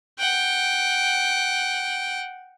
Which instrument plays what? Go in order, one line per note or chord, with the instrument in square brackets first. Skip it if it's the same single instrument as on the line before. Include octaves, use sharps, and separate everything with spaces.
[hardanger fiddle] F#5 G5